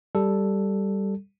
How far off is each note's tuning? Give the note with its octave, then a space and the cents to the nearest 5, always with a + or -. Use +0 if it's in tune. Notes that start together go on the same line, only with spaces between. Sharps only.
G3 +0 A4 +0